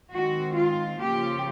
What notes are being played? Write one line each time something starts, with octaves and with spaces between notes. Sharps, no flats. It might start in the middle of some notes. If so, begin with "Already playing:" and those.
D#3 G#3 C4 F#4
F4
C#3 F3 A#3 C#4 F4 G4